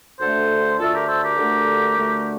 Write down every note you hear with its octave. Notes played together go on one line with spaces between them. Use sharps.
D2 D3 A3 A4 C5
D2 D3 A3 F4 A4
G4 A#4
A4 C5
G4 A#4
D2 D3 A3
D2 D3 A3